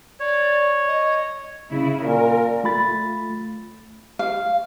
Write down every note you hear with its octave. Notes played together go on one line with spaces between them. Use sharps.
C#5 D5
D#5
C#3 E4
A#2 A#4
A3 F4 B5 A6
F5